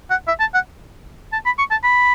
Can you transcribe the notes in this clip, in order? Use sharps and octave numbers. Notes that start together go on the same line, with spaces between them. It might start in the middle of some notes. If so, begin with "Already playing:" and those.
F#5
E5
A5
F#5
A5
B5
C#6
A5
B5